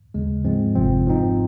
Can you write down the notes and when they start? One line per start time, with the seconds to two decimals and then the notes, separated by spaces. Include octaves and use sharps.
0.14 D#2 C#3 G#3
0.44 G#2 F3 G#3 C4
0.75 G1 F2 C3 F3 C4
1.06 G#2 F3 C4 D#4